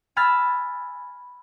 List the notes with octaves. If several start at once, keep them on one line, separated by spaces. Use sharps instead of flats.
G#5 B5 E6 F6 A6